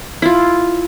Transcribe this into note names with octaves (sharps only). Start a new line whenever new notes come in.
E4 F4